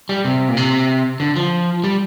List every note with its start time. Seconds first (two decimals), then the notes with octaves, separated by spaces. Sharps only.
0.09 G3
0.25 C3
0.49 A#2
0.57 C3
1.20 D3
1.36 F3
1.84 G3